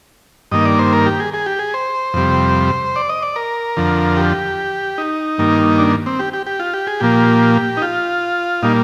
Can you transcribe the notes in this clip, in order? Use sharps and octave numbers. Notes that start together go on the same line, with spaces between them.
G2 D#3 A#3 D#5
D5
C5
A#4
G4
G#4
G#4
G4
G#4
C5
F2 C3 G3
D5
D#5
D5
A#4
F2 D3 F3
G4
D#4
G2 D#3 A#3
D4
C4
G4
G4
G4
F4
G4
G#4
A#2 F3 A#3 G4
D#4
F4
A#2 G3 A#3 D#4